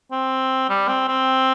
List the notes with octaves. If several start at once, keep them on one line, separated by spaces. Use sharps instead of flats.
C4
G3
C4
C4